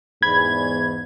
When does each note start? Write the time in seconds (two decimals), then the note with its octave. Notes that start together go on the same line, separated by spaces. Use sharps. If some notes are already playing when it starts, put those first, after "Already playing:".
0.23 E2 G#2 B5 G#6